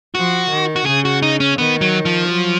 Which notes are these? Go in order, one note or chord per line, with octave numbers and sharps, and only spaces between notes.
F3 F#4
D#3
F#4
C#3 G#4
F#4
D#4
C#4
D#3 B3
F#3
F3
F#3